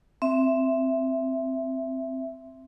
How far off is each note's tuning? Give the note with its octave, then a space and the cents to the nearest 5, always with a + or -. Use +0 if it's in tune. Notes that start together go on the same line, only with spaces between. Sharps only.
C4 +0 E5 +10